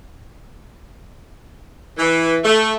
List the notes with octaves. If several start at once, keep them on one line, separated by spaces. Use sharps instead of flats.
E3
A3